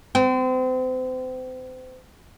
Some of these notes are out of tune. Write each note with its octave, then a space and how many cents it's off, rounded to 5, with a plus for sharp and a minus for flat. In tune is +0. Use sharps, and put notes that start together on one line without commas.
C4 -35